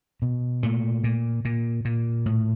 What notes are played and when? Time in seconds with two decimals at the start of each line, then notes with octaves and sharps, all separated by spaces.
0.22 B2
0.63 A#2 A3
1.04 A#2
1.45 A#2
1.85 A#2
2.26 A2